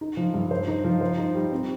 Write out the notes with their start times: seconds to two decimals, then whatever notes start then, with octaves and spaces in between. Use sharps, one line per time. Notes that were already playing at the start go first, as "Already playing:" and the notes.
0.01 D#4
0.17 F3
0.34 G2
0.51 C5
0.68 D#4
0.85 F3
1.01 C5
1.18 D#4
1.35 G3
1.52 C4